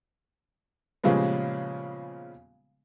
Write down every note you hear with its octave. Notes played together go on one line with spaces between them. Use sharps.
A#2 C#3 F3 G3 G#3 B3